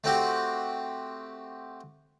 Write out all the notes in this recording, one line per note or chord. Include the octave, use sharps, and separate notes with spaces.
A3 C4 F#4 G4